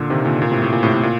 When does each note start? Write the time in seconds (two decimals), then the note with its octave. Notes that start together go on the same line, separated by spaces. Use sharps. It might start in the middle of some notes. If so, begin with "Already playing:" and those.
Already playing: A#2 D3
0.10 C3 D#3
0.25 A#2 D3
0.42 A#2
0.51 A2 C3
0.62 A2
0.73 A#2
0.83 A2 C3
0.93 A2
1.03 A#2